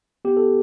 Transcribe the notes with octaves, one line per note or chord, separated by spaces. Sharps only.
B3 G4
A4